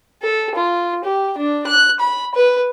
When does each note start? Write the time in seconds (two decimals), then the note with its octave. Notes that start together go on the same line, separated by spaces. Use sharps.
0.22 A4
0.55 F4
1.04 G4
1.38 D4
1.67 F#6
2.00 B5
2.35 B4